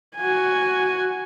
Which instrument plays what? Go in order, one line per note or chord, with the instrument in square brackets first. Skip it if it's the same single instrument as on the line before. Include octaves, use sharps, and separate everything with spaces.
[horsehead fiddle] F#4 G#5